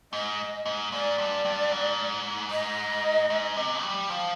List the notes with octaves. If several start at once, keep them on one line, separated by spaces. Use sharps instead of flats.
G#2 D#5
G#2
G#2 D5
G2
G2
G#2
D#5
G#2
C3
G3
F3 F5